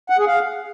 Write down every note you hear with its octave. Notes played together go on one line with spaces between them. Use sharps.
F#5
G#4
F5